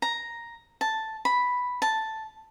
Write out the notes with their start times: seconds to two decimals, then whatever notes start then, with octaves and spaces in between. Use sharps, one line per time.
0.02 A#5
0.81 A5
1.25 B5
1.82 A5